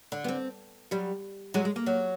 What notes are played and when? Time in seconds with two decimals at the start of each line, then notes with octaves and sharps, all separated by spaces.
0.12 D3
0.24 B3
0.28 C4
0.91 F#3 G3
1.54 F#3 G#3
1.65 G#3
1.76 A#3
1.86 F#3